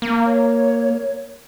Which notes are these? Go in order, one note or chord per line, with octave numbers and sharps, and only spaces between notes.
A#3
C#5